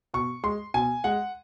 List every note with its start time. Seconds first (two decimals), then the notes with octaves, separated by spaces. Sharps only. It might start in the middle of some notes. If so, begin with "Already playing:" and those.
0.14 B2 C#6
0.43 G#3 C6
0.74 B2 G#5
1.04 G#3 F#5